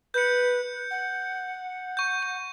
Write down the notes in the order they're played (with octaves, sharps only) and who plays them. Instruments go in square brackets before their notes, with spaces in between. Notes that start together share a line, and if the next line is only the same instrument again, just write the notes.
[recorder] B4 [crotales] G6 C#7
[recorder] F#5
[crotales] C#6 G6
C#6